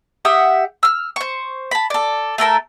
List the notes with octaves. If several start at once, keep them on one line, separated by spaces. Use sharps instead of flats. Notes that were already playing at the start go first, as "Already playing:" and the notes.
G4 E5 F#5 D#6
E6 F6
C5 C#6
A5 B5
A4 D5
A3 A4 A#4 A5